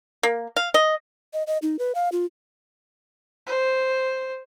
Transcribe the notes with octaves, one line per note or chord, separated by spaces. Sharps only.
A#3
F5
D#5
D#5
D#5
D#4
B4
F5
F4
C5